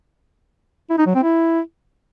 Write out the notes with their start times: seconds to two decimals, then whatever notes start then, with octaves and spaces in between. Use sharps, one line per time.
0.90 E4
0.98 D#4
1.07 F#3
1.15 C4
1.23 E4